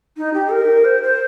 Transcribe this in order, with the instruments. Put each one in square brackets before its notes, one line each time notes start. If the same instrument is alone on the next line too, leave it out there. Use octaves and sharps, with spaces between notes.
[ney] D#4
G4
A#4
C5
C5